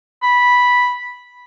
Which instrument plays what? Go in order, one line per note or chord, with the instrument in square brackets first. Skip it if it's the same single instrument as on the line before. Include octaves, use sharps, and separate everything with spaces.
[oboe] B5